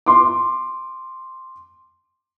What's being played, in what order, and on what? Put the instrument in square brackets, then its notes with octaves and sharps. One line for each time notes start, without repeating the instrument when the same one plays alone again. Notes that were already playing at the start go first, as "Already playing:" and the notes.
[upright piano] C6 D6